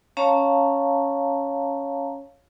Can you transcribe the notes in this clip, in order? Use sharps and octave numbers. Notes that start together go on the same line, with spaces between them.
C#4 C#5 F5 A5 A#5